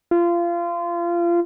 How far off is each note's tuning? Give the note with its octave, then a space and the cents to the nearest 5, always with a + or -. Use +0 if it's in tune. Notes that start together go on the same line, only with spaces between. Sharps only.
F4 -25